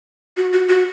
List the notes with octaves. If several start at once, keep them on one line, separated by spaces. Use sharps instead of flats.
F#4
F#4
F#4